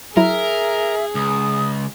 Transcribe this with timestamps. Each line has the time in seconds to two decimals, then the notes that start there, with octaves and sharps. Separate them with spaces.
0.17 F#3 E4 G#4 A#4 E5
1.15 C#2 D#6